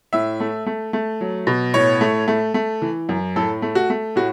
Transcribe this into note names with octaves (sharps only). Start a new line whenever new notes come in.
A2 E5
A3
A3
A3
F#3
B2
A2 C#5
A3
A3
A3
E3
F#2
A2 A4
A3
F#4
A3
A2 F#4